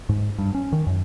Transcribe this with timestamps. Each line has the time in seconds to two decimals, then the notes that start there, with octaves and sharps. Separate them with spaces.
0.09 G#2
0.38 G2
0.55 C#4
0.72 D#3
0.87 F#2